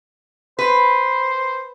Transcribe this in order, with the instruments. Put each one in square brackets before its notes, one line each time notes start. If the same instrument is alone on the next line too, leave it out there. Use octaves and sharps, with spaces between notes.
[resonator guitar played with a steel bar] B4 [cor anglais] C5